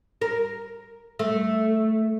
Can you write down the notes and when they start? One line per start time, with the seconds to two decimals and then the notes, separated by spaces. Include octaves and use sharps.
0.21 A#4
1.19 A3